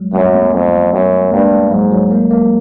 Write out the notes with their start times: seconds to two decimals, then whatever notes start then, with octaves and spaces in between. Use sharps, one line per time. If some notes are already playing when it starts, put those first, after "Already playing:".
Already playing: F#3 G#3
0.13 F#2 G3 A3
0.33 A3 B3
0.53 F2
0.92 F#2
1.32 G2 G#3 A#3
1.52 G3 A3
1.71 G#2 F#3 G#3
1.91 F#3 G#3
2.11 G#3 A#3
2.30 G#3 A#3